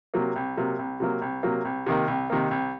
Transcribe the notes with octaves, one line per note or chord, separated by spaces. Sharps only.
C3 F#3 A#3
C2
C3 F#3 A#3
C2
C3 F#3 A#3
C2
C3 F#3 A#3
C2
C3 D#3 A#3
C2
C3 D#3 A#3
C2